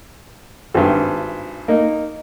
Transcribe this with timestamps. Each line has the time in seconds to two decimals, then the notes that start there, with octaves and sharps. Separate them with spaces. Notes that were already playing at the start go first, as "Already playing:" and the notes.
0.75 G#1 G2
1.68 A#3 D#4